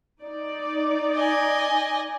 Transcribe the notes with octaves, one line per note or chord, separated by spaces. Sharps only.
D#4 D5
D#5 G#5